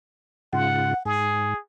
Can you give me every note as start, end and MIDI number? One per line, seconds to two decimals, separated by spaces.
0.53 0.94 44
0.53 0.94 49
0.53 0.94 65
0.53 1.03 78
1.05 1.54 44
1.05 1.59 68